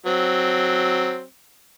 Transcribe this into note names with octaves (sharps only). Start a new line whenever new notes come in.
F#3 C4